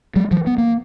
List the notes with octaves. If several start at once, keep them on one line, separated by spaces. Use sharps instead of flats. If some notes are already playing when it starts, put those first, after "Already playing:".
F#3 G#3
E3 F#3
B3
A#3